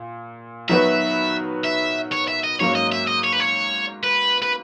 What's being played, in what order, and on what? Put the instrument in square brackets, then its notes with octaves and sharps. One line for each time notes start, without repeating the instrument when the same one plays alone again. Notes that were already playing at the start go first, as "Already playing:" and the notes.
Already playing: [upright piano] A#2
[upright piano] D#3 F#3 B3 F#4 B4 [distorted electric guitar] E5
[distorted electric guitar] E5
C#5
E5
D#5
[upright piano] G#2 F#3 A#3 C#4 [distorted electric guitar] C#5
[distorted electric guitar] D#5
E5
D#5
C#5
B4
C#5
B4
B4